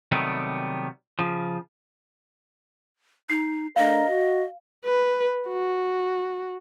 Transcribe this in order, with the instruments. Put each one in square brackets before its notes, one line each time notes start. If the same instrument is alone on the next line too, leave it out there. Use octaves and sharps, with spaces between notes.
[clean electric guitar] C3 D#3 F#3 G3 A3 B3
C#3 F3
[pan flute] D#4 [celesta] C7
[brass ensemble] A3 D4 A#4 [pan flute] D#5 [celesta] F5
[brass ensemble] F#4
[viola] B4
F#4